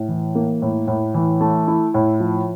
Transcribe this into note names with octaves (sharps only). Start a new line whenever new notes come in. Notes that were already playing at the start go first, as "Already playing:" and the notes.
Already playing: A2
E3
A#3
A2
A2
E3
A3
E4
A2
F3